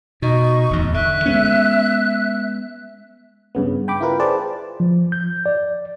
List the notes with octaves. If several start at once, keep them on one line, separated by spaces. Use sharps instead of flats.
B2 D#4 C#6
D1 E2
D3 E5 F#6
G#3 B3 C#4
G2 C#3 B3
G5 B5 D6
E4 F4 A#4 B4
G#4 B4 C5 D5 G5 A5
F3
G6
D5